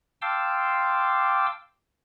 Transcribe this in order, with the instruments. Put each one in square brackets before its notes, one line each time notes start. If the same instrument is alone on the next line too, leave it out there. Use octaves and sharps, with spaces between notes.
[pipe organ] F5 G5 A5 C6 D6 E6